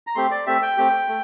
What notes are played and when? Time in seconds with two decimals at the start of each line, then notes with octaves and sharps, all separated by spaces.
0.07 A#5
0.15 A3 C4 G4 C6
0.31 D5
0.46 A3 C4 G4 E5
0.62 G5
0.77 A3 C4 G4
1.08 A3